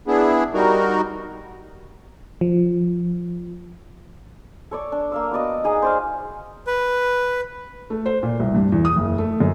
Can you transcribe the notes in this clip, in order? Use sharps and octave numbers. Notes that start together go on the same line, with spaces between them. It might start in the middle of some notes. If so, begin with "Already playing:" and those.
B3 D4 E4 G#4
G3 D#4 F#4 A#4
F3
A4 C#5 D5
D4
A#3 F5 E6
B3 F#4 D5 D#5
D#4 G#4 D#5 F#5
C5 D5 F5
B4
A3
C5
A#2
C2
G2
E2
D#6
F#1
A3
F#2